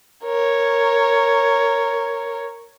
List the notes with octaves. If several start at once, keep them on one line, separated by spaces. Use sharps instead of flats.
A#4 C#5